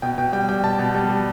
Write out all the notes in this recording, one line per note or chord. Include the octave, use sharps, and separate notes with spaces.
B2 G5
B2 G5
G3 G5
G3 G5
B2 A5
B2
G3
G3